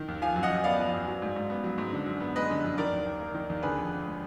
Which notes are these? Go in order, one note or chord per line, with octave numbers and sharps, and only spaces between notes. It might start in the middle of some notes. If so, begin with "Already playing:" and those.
Already playing: D#3
D#2
F3 F5 G#5
F#2
D#5 F#5
F#2
B3 D5 F5
F3
F#2
F#3
G#2
G#2
B3
F#3
G#2
D3
F#2
B3
G#3 B4 D#5
D3
F#2
D#3 A#4 D5
D#2
D#2
A#3
D#3
D#2
D3 G#4 B4
F2
F2
G#3